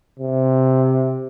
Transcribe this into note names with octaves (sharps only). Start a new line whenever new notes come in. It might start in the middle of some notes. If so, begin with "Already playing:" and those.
C3